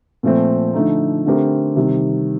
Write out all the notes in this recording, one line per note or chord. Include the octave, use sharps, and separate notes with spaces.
A#2 F3 A3 C4
D3 F3 A3 D#4
D3 A3 C4 G4 A#4
C3 D#3 G3